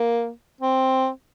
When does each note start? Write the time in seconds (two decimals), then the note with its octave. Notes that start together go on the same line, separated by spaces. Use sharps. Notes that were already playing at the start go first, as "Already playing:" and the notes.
Already playing: A#3
0.61 C4